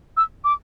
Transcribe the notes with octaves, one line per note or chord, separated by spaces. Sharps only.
E6
D6